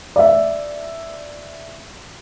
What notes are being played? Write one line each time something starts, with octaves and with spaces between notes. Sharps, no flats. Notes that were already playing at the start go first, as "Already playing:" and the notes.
D5 E5